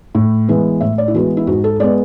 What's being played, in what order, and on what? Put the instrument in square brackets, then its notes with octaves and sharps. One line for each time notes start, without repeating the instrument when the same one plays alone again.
[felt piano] A2
E3 G#3 B3
A2 E5
D5
E4
E3 G#3 B3 F#4
E4
G#2 F#4
A4
G#3 B3 D5